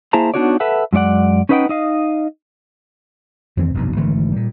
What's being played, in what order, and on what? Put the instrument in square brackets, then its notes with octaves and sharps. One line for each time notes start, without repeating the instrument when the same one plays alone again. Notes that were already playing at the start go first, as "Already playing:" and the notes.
[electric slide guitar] A#3 E4 G#4 C5 A5 A#5
B3 D4 D#4 F#4 C#5 D5
A4 B4 E5 F#5
F#2 G#3 C#4 D5 F#5
C#4 D#4 B4 D#5 F#5 G5
D#4 D#5 F5
[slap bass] F2 D#3 E3 C4
F1 B1 G2
G#1 D3 E3 A3
A#2 G3